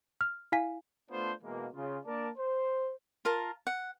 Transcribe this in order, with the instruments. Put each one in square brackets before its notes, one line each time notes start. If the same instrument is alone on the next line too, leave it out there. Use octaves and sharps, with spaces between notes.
[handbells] F6
E4 F5 G#5 B6
[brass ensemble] A3 B3 D4 F4 A4 C5
B2 E3 G#3 A#3
C#3 F4
A#3 D4 A#4 D5 A5
C5
[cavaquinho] F4 A#4 A5 A#5
F#5